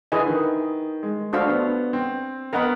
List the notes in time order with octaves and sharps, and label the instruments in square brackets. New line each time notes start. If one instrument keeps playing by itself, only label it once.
[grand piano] D3 [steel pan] E4 G#4 B4 D#5 G#5
[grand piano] D#3
G#3
[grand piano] A3 [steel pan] D4 F#4 A4 C5 F5
[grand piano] B3
C4
[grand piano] B3 [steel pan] A#4 D#5 F#5 B5